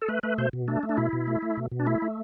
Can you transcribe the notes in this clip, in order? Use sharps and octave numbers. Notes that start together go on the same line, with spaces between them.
A4
A3 B4
A3 B4
B2 C5
B2
A3 D4
A3
D4
B2 E4
B2
A3
A3
B2
B2
D4
A3 E4
A3